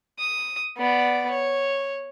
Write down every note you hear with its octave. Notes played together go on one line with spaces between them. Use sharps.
D#6
B3 D5
C#5